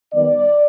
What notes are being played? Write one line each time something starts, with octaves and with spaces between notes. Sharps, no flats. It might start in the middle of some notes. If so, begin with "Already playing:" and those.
D#3 G3 B3 D5